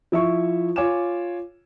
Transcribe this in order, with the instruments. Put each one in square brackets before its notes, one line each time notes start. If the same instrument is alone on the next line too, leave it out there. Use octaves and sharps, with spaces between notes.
[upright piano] F3 E4 E5 C#6
F4 C#5 G#5 D6 E7